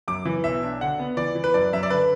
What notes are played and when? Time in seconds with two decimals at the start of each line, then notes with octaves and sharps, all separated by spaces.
0.08 F#2 D6
0.25 E3
0.44 B1 E5
0.63 D4
0.81 D3 F#5
0.99 B3
1.17 E3 D5
1.35 E3
1.44 B4
1.54 F#2 D5
1.73 F#2 E5
1.83 D5
1.90 D3 B4